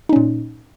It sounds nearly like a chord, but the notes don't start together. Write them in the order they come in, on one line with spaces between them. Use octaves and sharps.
D#4 C#4 A#2